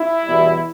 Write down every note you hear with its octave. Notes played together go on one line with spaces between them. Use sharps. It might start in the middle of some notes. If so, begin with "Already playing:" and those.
Already playing: E4
E2 B2 G3